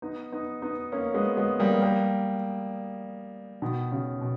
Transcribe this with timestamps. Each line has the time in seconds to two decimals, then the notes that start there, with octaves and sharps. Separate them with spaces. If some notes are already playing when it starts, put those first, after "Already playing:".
0.02 B3 D#4
0.32 B3 D#4
0.62 B3 D#4
0.92 A#3 C#4
1.14 G#3 B3
1.37 G#3 B3
1.59 G3 A#3
1.82 G3 A#3
3.62 B2 D#3
3.92 C#3
4.21 B2